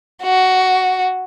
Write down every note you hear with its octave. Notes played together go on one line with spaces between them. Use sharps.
F#4